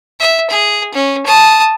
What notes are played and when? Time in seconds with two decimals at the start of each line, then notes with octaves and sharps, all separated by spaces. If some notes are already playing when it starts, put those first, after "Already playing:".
0.20 E5
0.50 G#4
0.94 C#4
1.26 A5 D#6